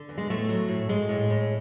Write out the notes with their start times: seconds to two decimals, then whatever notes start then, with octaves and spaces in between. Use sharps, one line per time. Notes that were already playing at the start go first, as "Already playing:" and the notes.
Already playing: D3
0.09 E2
0.18 G#3
0.30 A2 A3
0.49 F#3
0.69 A2
0.89 A2 G#3
1.09 A2
1.29 A2